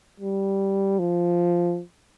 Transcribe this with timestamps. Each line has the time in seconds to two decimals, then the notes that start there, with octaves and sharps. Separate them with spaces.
0.20 G3
0.99 F3